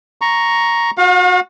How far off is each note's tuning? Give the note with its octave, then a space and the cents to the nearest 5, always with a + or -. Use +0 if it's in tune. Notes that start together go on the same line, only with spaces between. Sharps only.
A#5 +5 C#6 +0
F#4 -30 F5 +40